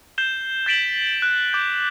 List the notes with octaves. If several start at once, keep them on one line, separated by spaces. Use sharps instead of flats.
G6 C7 E7 G7
G6 A6 B6 D7 E7 F#7
F#6
D6 G6